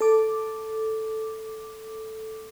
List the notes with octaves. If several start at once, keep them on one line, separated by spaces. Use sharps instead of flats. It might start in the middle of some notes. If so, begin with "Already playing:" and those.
A4 D6